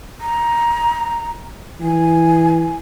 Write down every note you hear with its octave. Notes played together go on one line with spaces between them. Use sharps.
A#5
E3 G#5